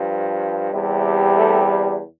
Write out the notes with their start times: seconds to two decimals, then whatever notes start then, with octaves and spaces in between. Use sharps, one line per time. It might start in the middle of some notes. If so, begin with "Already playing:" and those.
Already playing: G2 F3
0.73 E2 C3 G3
1.38 A3